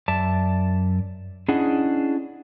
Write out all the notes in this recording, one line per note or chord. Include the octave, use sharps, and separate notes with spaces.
F#2 D5 E5 A5
C#4 D4 E4 G#4 D#5 F#5